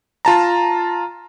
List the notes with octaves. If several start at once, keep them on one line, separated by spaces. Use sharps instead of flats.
F4 A5 A#5